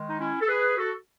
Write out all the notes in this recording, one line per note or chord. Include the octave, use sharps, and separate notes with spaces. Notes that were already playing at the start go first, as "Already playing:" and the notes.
Already playing: D#3 G#3
D#4
C#4 E4
A4
G#4 B4
F#4 A4